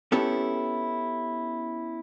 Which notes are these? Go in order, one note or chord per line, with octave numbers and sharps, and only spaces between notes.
B3 C#4 E4 G4 A4